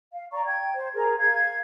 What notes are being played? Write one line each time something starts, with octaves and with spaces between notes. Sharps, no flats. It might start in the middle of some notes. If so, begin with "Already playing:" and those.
F5
D5 A#5 C#6
G5 G#6
C5
G#4 A#4 A#5
F5 G#6